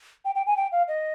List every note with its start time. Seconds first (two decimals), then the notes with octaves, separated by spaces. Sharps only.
0.25 G5
0.35 G5
0.47 G#5
0.57 G5
0.72 F5
0.88 D#5